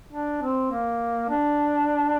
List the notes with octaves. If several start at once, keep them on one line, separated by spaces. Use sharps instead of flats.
D4
C4
A#3
D4